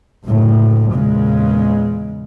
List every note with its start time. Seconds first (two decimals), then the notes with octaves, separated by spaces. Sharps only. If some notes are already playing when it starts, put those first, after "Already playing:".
0.25 F#1 D2 A2
0.93 E2 A#2 C#3 G#3